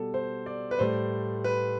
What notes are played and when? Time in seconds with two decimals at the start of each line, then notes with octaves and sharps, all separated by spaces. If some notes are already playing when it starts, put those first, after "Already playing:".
Already playing: B2 G3 A4
0.14 C5
0.46 D5
0.71 B4
0.79 A2 G3 C5
1.44 B4